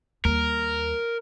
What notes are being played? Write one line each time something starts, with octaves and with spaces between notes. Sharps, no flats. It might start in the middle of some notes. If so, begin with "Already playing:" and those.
D#2 G3 A#4